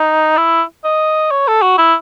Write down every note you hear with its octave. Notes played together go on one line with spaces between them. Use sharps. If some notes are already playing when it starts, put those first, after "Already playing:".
Already playing: D#4
E4
D#5
C#5
A4
F#4
E4